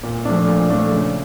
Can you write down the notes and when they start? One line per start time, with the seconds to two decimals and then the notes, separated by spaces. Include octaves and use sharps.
0.03 A#2
0.25 F3 A3 D4
0.47 A#2
0.70 F3 A3 D4
0.92 C#3